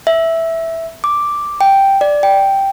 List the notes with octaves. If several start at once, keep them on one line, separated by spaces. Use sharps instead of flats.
E5
D6
G5
D5
G5